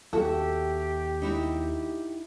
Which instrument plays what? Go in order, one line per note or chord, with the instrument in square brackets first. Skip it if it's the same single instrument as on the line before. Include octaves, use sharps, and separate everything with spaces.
[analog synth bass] D#2 [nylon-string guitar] F#4 E5 [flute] G4 [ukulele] A4
[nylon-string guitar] D#4 E4 F#4